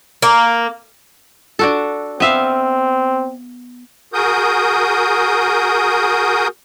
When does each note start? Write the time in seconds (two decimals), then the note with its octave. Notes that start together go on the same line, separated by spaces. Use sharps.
0.22 A#3
1.59 D4 F#4 A4
2.20 B3 C4 E5 F5
4.14 F#4 G#4 A#4 D#6 G6